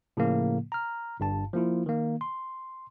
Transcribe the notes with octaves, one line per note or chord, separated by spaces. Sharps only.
A2 C#3 F3 A#3
A#5 F6
G1 G2 A5
F3 A#3 E4 F4
D#3 A#3
C6